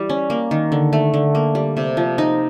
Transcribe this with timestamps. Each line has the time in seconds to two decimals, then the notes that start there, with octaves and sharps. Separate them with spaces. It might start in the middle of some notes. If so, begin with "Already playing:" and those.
Already playing: E3 G3
0.09 C#4
0.30 A#3
0.51 D#3
0.72 D3
0.93 A3
1.14 D3
1.35 A#3
1.55 G3
1.77 C3
1.97 F3
2.18 D#4